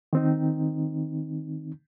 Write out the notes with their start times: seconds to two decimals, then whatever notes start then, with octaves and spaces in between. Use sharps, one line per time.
0.13 D#3 C4 D#4